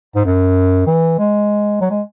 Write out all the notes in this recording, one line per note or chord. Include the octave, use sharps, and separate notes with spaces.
G#2
F#2
E3
G#3
F#3
G#3